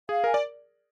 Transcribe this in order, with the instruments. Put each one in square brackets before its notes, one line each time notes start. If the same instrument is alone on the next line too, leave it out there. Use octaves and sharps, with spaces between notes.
[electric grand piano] G#4 [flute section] F5
[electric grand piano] A#4 [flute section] G#5
[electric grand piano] D5